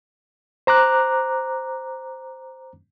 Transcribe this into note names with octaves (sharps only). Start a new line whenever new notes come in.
C5 A#5 D6 F#6